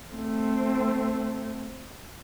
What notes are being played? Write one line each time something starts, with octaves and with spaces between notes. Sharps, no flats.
A3 C4